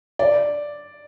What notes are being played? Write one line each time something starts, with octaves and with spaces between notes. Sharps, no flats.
D5